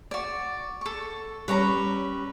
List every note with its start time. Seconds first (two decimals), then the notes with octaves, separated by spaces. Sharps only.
0.11 F#4 D5
0.81 A4 C#6
1.48 G3 C#4 B4 C#5 A#5